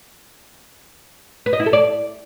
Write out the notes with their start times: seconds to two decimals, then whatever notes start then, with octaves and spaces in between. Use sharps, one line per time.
1.46 B4
1.53 D#5
1.60 E4
1.66 A4
1.73 D5